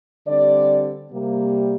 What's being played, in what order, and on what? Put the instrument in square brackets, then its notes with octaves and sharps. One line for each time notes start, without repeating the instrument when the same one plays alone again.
[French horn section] D3 G3 C4 D5
C3 G3 A#3